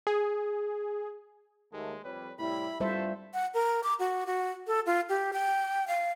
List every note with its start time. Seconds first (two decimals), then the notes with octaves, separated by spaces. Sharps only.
0.07 G#4
1.73 D#2 G#3 A3
2.04 F2 G3 B4 C#5
2.39 A2 C3 G3 E4 B5
2.80 G2 G3 A3 F4 A4 C5 E5
3.34 F#5
3.54 A#4
3.84 D6
3.99 F#4
4.27 F#4
4.67 A4
4.86 F4
5.09 G4
5.33 G5
5.88 F5